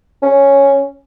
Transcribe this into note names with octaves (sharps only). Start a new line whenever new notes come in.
C#4